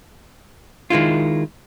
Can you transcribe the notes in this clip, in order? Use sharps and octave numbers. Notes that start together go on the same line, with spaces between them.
D#3 G#3 E4 F4